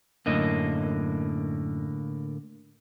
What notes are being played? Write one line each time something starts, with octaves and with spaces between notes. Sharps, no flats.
F#2 A2 D3 A#3 D#5